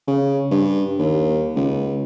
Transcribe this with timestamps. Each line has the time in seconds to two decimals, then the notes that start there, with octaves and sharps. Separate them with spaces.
0.07 C#3
0.51 G2
0.99 D#2
1.56 C#2